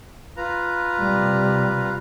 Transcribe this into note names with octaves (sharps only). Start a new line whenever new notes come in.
F4 B4 A#5
C3 G3